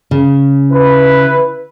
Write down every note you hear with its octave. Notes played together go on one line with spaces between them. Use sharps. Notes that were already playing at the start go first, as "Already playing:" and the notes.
C#3
E4 B4